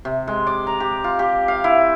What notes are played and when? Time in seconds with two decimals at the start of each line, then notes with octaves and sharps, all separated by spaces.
0.05 C3
0.27 G#3
0.47 D5
0.67 A#5
0.80 G4
1.04 F4
1.19 G4
1.48 F5
1.64 E4